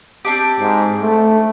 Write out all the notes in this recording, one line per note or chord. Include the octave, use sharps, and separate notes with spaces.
C4 D4 G4
G#2
A3